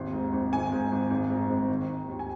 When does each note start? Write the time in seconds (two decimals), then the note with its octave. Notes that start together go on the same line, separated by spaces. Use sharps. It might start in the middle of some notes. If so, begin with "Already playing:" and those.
Already playing: G#1 D#2 C6
0.13 G#2
0.33 G#1
0.52 G#1 G#5
0.72 G#2
0.92 G#1
1.10 G#1
1.30 G#2
1.49 G#1
1.68 D#3
1.88 D#3
2.08 D#2
2.19 G#5